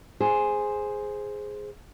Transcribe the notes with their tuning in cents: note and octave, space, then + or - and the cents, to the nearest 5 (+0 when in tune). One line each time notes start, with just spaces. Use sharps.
G#4 +0 C5 +0